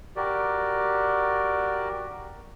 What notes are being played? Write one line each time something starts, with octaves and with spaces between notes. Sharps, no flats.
F#4 G4 A#4 D5